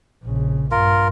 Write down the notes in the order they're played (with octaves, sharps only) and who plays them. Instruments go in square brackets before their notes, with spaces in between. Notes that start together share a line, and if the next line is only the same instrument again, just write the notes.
[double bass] A#1 C#3
[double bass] G2 [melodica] F4 A#4